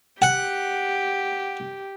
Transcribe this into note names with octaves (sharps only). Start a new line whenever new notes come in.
G4 F#5